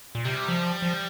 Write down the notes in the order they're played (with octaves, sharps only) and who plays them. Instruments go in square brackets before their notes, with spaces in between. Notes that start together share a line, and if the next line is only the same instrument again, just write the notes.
[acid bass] A#2
[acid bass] C3 [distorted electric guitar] G3
[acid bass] F3
F3